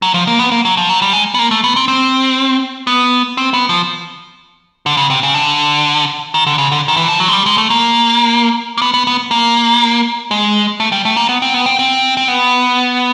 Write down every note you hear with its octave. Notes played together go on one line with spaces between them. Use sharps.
F#3
F3
A#3
B3
A#3
F#3
F3
F#3
G3
G#3
B3
A#3
A3
B3
C4
C4
B3
C4
B3
F3
D3
C#3
C3
C#3
D3
D#3
D3
C#3
D3
D#3
E3
F3
F#3
G#3
G3
G#3
A3
A#3
A#3
B3
B3
B3
A#3
G#3
A3
G3
A3
A#3
B3
C4
B3
C4
C4
C4
B3